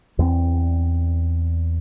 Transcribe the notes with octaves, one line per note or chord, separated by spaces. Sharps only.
E2 A#3 C4